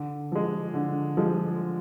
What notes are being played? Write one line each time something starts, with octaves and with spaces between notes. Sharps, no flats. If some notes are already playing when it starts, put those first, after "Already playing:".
Already playing: D3
F3 G#3
D3
F3 G#3